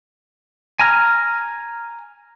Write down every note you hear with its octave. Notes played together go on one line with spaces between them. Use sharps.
G#5 A#5 F6